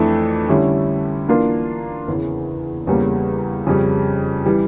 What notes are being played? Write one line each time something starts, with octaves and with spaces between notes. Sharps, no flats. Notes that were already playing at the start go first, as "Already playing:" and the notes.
Already playing: F2 E3 A3 D4 A4
D3 G3 C#4 E4
E3 A#3 D4 F4 A#4
E2 C#3 E3
E2 C#3 G3 A#3
F2 C#3 G3 C#4
E3 G3